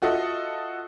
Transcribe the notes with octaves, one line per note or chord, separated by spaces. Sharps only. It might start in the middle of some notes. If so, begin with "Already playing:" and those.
F4 F#4 A4 D#5 E5